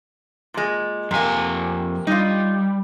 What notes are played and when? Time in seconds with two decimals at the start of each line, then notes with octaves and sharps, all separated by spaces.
0.54 A#2 G#3
1.11 F2 C3 A#3 G#5
2.07 G3 D#4 F4